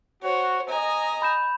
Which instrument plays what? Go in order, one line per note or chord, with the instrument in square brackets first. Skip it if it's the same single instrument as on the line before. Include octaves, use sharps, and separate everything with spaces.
[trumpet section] F#4 [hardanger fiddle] C5 C#5
[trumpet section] D#5 [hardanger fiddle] G#5 A#5
[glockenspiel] B5 G6 E7